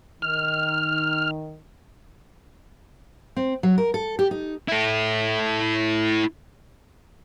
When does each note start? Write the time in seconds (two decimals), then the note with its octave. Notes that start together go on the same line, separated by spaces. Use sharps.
0.22 D#3 F6
3.36 C4
3.63 F#3
3.78 A#4
3.94 A4
4.19 G4
4.31 D#4
4.68 E4 A4